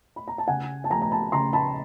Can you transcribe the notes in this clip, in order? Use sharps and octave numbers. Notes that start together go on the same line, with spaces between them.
B5
A#5
A5
C#3 F#5 G#5
A5
F3 A3 G#5 A#5
A#5
A5 B5
C#3 A#5 C6
A5 B5